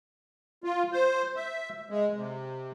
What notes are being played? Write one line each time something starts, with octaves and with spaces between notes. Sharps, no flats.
F4
C5
E5
G#3
C3